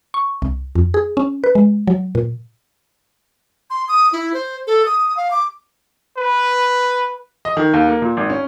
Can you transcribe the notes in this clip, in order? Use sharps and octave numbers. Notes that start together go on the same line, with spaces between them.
C#6
C2
F2
G#4
C#4
B4
G#3
F#3
A#2
C6
D#6
E4
C5
A4
D#6
F5
D6
B4
D#5
D#3
D#2
A#3
A#2
G#1
C#4